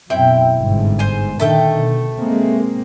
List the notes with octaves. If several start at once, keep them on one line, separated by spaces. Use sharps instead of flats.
F#2 B2 C4 E4 G5
G1 G#2
C5 G#5
A#2 D3 D#3 A3 A4 G5
B2
G#3 A#3 C4